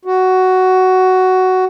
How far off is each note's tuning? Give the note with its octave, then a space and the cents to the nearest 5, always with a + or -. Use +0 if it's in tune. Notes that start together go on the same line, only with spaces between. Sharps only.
F#4 +10